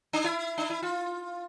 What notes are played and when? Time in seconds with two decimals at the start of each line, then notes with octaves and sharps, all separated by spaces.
0.13 D4
0.24 E4
0.58 D4
0.70 E4
0.82 F4